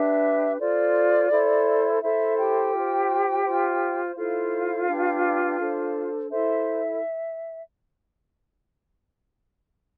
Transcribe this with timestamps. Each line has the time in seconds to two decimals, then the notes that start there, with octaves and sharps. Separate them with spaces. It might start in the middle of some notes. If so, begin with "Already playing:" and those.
Already playing: D4 G4 B4 E5
0.59 F4 A4 C5 D5
1.30 E4 A4 C5
2.01 E4 A4 C5 E5
2.38 G4 G5
2.73 F4
2.78 C5
3.45 F4 C5
4.16 E4 F4 A4 C5 F5
4.87 D4 G4 B4
5.59 D4 A4 C5
6.30 E4 A4 C5 E5